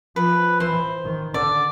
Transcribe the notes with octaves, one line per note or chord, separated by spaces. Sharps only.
F3 B4
E3 C5
D#3
D3 D5